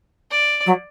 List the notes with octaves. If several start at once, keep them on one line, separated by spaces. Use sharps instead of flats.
D5
F#3